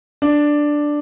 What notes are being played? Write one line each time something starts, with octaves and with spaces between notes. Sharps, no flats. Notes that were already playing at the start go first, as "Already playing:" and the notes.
D4